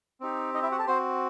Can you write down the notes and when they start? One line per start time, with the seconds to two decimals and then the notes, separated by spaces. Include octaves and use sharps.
0.20 C4 D#4 G4
0.54 D#4 D#5
0.63 E4 E5
0.72 F#4 F#5
0.79 A4 A5
0.87 C4 F#4 C5 C6